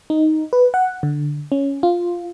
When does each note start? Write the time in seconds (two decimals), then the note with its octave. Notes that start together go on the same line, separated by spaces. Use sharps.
0.10 D#4
0.53 B4
0.74 F#5
1.03 D3
1.52 C#4
1.83 F4